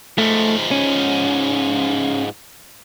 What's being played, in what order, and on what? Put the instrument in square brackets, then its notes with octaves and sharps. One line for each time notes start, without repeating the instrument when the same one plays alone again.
[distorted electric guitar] G#2 F3 [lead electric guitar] A3
[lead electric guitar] C#4